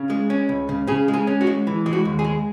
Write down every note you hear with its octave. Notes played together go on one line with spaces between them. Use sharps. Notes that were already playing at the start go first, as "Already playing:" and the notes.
Already playing: C#3
G#3
C#4
C#2
C#3
C#3 G#4
G#3
G#4
C#4
F#4
G#3
E3
G#3
F#4
D#2
G#4
G#3